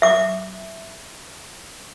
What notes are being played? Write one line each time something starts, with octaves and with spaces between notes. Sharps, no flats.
E5 D6